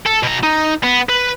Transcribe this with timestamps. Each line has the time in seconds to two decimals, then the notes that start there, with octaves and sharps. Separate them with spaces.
0.06 A4
0.23 B2 A#5
0.43 D#4
0.83 B3
1.09 B4